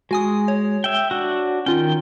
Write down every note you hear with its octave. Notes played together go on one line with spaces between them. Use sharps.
G#3 F#4 G#5 D#6
C#5
E5 G5
D4 F#4
D#3 C#4 F4 G5